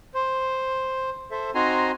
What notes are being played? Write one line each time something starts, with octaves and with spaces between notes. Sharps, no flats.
C5
A4 C5 E5
C4 D#4 F#4 G#5 A#5 C6